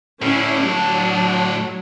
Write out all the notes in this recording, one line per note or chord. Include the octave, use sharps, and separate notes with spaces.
A2 D3 C#4 E4
F#3 D4